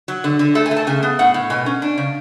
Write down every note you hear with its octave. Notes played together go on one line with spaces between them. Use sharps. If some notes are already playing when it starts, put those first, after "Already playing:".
F#3
D3
D3
A3 A4
G#5
A3
A5
C#3 G#5
B3
A2 F#5
A2
B2 G#5
C#4
D4
C#3